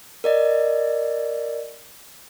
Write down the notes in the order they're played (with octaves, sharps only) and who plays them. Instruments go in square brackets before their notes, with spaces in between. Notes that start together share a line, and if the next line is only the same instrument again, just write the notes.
[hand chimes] A#4 D5 D#5